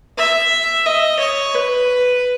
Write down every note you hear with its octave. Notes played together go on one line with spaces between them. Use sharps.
E5
D#5
C#5
B4